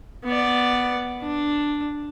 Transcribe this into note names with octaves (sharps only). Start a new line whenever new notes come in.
B3 D5
D4